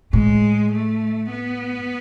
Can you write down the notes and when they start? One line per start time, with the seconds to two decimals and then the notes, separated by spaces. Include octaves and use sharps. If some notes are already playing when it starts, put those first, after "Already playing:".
0.13 A2 G#3
0.72 A3
1.31 B3